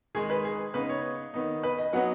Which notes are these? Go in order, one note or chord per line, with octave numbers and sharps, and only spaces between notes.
D#3 G#3 D#4 G#4
B4
G#4
C#3 B3 D#4 B4
C#5
D#3 B3 D#4
B4
D#5
F#3 B3 D#4 F#5